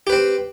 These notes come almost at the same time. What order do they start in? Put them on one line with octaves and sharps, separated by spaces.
G4 B4 C4